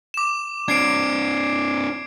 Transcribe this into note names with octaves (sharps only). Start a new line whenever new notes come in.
D6 E7
C4 D4 G#6 C7 D7